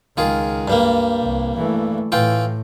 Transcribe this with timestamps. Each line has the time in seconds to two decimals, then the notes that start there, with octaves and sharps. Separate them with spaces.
0.17 C#2 D#3 G#3 F4 G#4
0.68 G2 G3 A#3
1.22 C2
1.57 E3 A3
2.12 A2 E3 F4 G5